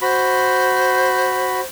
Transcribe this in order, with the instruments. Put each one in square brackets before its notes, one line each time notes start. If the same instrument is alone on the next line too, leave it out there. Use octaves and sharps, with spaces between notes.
[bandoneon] F#4 B5 [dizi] C5